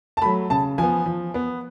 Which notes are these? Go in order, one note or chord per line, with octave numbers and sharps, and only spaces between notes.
A5
F#3 A3 B5
C#3 A5
F3 B3 G#5
F3
B3